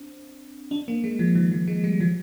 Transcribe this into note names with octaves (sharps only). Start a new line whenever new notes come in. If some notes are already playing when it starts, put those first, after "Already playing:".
Already playing: C4 D4
D4
A#3
G#3
F3
D#3
F3
G#3
G3
F3